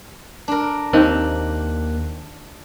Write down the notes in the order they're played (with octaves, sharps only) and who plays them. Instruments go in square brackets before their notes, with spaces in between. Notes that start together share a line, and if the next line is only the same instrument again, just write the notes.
[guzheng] D4 A#4
[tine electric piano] D#2 A#3 F#6 [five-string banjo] C4 D#4